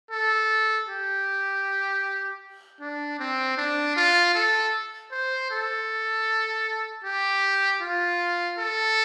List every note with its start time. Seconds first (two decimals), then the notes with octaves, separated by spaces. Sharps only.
0.11 A4
0.89 G4
2.81 D4
3.20 C4
3.58 D4
3.96 F4
4.35 A4
5.12 C5
5.51 A4
7.04 G4
7.81 F4
8.59 A4